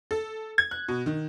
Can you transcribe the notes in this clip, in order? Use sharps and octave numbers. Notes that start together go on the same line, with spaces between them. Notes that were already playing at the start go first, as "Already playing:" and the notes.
A4
G#6
F#6
B2
D#3